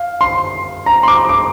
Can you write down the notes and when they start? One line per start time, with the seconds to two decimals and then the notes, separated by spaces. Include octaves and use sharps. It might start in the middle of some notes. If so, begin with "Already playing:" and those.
Already playing: F5
0.21 C6
0.86 A#5
1.03 C6
1.08 D6
1.29 D6